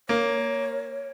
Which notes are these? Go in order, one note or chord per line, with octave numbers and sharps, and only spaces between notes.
A#3 C#5